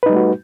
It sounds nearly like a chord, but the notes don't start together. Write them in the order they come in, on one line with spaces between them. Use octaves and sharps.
B4 D#4 G3 A3 F#4